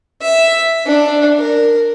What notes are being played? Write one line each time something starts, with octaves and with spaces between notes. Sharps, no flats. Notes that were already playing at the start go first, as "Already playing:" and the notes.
E5
D4
A#4